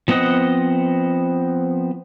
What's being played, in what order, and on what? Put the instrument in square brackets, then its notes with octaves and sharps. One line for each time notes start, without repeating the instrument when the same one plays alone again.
[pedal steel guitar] F3 B3 C4 D#5 F#5